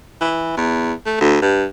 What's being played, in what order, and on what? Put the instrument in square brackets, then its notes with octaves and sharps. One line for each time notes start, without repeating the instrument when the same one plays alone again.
[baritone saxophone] E3
E2
A3
D2
G2